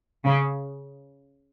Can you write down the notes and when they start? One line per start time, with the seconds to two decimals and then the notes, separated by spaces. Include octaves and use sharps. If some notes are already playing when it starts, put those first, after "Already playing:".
0.25 C#3